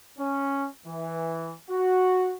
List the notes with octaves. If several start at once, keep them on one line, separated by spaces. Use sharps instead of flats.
C#4
E3
F#4